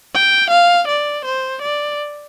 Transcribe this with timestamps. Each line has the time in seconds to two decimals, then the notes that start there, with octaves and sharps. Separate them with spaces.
0.15 G5
0.50 F5
0.88 D5
1.25 C5
1.62 D5